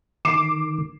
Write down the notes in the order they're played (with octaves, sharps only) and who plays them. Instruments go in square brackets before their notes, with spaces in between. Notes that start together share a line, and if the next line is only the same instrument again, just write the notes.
[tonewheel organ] D#3 [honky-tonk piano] D6 C7 E7